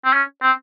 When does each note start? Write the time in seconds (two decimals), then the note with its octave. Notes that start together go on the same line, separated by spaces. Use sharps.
0.05 C4
0.13 C#4
0.42 C4